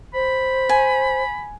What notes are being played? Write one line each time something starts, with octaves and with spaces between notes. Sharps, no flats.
C5 B5
G#5